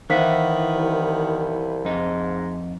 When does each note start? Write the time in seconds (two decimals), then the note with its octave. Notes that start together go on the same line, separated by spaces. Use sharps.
0.10 D#3 E3 B3 E4 C5 F5 B6
0.75 C2
1.85 F2 G#2 D#4